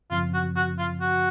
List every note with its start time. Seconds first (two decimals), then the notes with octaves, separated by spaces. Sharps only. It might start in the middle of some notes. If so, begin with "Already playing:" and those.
0.10 F#2 C#3 F3 C4 F4
0.33 F#4
0.56 F#4
0.79 F4
1.01 F#4